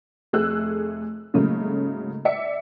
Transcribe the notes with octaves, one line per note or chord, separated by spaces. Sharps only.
F1 A3 G#4 E6 F#6
G#2 C#3 F#3 A3 A#3
D5 E5 C#7